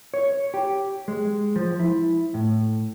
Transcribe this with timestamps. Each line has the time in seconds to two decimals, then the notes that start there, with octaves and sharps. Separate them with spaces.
0.14 C#5
0.54 G4
1.08 G#3
1.56 F3
1.80 E4
2.34 A2